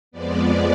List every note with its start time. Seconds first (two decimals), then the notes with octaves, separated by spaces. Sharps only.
0.11 F2 F3 G#3 B3 D5